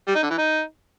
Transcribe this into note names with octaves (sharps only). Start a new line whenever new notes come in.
G3
D#4
D3
E3
D#4